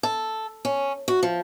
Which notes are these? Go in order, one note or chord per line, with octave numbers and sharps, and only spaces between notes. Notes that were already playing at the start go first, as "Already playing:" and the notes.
A4
C#4
F#4
F3